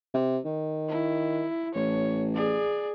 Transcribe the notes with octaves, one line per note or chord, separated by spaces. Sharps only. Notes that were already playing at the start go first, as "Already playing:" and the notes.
C3
D#3
E4
A1 C#5
G#4 D5